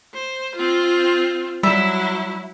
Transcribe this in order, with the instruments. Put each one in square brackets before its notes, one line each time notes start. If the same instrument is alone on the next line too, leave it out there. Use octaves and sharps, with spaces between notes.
[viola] C5
C4 F4
[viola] F#3 E4 [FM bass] G3 [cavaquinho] E5